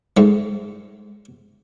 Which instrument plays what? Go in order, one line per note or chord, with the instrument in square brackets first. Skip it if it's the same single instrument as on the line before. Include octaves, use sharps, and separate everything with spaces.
[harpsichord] G#2 A3